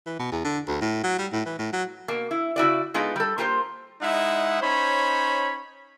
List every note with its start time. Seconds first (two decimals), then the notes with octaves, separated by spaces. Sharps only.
0.06 E3
0.19 B2
0.32 E2
0.44 D3
0.68 D2
0.81 A2
1.04 F#3
1.19 G3
1.33 A2
1.46 E3
1.59 A2
1.73 F#3
2.08 B2 A#3
2.31 E4
2.56 C#3 E4 F#4 D5
2.94 G#3 B3 D#4 F4 A4
3.16 G3 A4
3.38 A#3 F4 G4 A4 C5
4.02 G#3 D#4 E4 E5 F#5
4.61 C#4 D#4 C5 C#5 B5